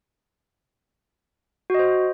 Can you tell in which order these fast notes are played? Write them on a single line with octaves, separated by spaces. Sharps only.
F#4 D#5 C5